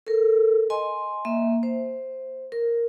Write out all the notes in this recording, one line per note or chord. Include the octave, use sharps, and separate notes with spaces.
A4 A#4
D#5 G#5 C6
A#3 E5
C5
A#4